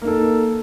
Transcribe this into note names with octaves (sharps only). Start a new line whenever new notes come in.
A#3 D#4 A4